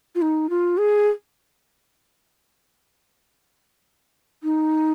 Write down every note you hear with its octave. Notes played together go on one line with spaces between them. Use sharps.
F4
D#4
F4
G#4
D#4